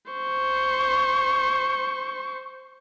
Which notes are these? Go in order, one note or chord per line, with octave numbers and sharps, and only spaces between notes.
C5 C#6